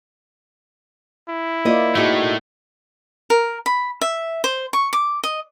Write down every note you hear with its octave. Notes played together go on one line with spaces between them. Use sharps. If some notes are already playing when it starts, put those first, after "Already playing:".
E4
A#3 F4 C5 D5 D#5
A2 A3 D#4 F#4 G#4
A#4
B5
E5
C5
C#6
D6
D#5